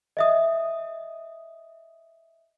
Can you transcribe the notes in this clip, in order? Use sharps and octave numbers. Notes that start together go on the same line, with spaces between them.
D#5 E5 D#6